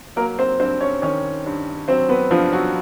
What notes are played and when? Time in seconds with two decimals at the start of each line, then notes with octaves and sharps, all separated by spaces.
0.16 F#3 A#3 A#4
0.38 C4 C5
0.60 G2 C4 C5
0.80 C#4 C#5
1.02 D#3 C#4 C#5
1.46 G2
1.88 F#3 C4 C5
2.09 B3 B4
2.31 G2 F3 F4
2.52 F#3 F#4